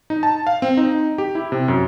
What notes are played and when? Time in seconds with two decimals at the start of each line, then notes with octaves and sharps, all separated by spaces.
0.10 D#4
0.23 A5
0.47 F5
0.62 C4
0.77 D#4
1.18 G4
1.35 E4
1.52 C3
1.68 F#2